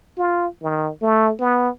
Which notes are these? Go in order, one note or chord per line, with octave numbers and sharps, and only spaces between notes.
F4
D#3
A3
B3